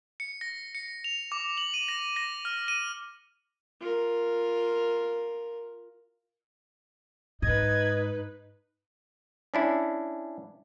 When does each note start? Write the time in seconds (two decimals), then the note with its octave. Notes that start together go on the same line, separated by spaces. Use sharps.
0.20 C#7
0.41 A#6
0.75 C#7
1.04 F7
1.32 D6
1.57 F#7
1.74 D#7
1.88 A#6
2.16 A#6
2.45 F6
2.68 D#7
3.81 F4 A#4
7.42 G#2 D#4 B4 D#5 G#6
9.54 C#4 D4 E4